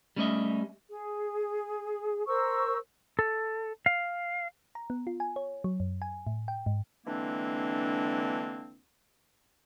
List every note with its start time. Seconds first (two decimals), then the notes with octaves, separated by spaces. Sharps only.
0.16 G3 A3 C#4 C5 D#5 E5
0.89 G#4
2.27 A#4 C5 C#6 E6
3.19 A4
3.86 F5
4.75 A#5
4.90 B3
5.07 F4
5.20 G#5
5.36 C#5
5.64 F#3
5.80 F#2
6.02 G#5
6.27 A2
6.48 G5
6.66 G#2
7.05 D3 E3 G#3 A#3 C4 D4